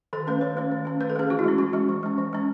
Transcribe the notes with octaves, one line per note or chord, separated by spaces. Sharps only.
D#3 A4
A3 C#4 B4
D#3 C#5
A3 C#4
D#3
A3 C#4
D#3 B4
A4
A3 C#4 G#4
E3 F#4
E4
G#3 C#4
E3 F#4
G#3 C#4
E3
G#3 C#4
E3
G#3 C#4